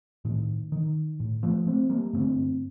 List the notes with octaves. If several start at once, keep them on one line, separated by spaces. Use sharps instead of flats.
A2 D#3
D#3
A2
F3 A3
A3 C4
G3 A#3
G2 D3 A3 C4